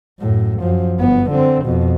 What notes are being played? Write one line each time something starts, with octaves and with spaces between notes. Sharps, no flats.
F#2 A2
F#2 F3
G1 B3
D3 C4
F2 B2